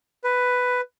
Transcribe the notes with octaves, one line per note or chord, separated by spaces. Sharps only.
B4